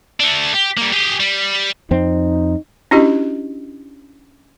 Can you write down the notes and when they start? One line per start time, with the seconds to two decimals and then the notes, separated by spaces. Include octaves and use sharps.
0.20 A3 D4
0.54 G4
0.77 G3 A#3
0.92 G4 G#4
1.20 G3
1.91 F2 C4 D#4
2.91 C#4 D4 E4 F#4 G4 D#5